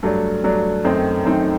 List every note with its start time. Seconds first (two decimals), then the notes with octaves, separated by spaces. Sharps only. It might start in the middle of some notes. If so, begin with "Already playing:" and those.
0.03 G2 F#3 A3 D4
0.44 G2 F#3 A3 D4
0.85 F#2 D#3 A3 C4 D#4
1.25 F#2 D#3 A3 C4 D#4